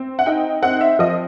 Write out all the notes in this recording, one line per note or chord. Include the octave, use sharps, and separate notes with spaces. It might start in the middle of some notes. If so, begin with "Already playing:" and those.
Already playing: C4
F#5
D#4 G5
C4 F#5
E5
F3 D#5